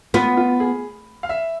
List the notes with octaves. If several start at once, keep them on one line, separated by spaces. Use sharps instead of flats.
B3 F4
F4
G#4
F5
E5